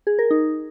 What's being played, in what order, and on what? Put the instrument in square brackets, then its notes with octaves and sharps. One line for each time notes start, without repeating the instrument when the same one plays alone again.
[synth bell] G#4
A#4
D#4